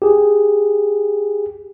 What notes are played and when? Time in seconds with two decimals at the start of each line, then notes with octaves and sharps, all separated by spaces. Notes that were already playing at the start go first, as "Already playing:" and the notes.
0.02 G4 G#4